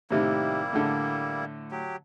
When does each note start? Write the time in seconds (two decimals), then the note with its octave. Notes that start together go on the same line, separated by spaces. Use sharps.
0.11 A2 C3 D#3 G3 A#3 E4
0.73 A2 D3
1.71 F#3 G4